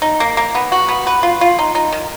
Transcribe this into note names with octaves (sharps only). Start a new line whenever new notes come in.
D#4
A#3
A#3
B3
F#4
B3
B4
F4
F4
D#4
D#4
D#3